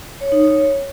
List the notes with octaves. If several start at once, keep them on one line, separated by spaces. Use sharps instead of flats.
C#5
D#4
C#5